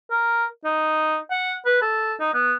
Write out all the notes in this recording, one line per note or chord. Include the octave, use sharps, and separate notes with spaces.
A#4
D#4
F#5
B4
A4
D#4
B3